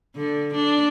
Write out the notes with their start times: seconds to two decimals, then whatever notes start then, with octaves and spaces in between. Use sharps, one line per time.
0.16 D3
0.54 D4